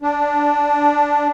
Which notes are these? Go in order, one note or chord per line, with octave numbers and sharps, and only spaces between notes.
D4